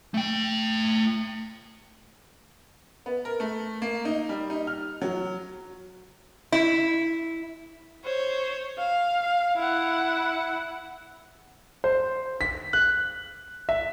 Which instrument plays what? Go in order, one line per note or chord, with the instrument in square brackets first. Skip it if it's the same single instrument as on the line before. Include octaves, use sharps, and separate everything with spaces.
[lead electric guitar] A3 G5
[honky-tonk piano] B3
A#4
A3
A#3
D#4
G3
D#4
F6
F#3
[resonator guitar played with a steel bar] E4
[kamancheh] C5 C#5
F5
E4 F#5
[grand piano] C5
B6
F#6
E5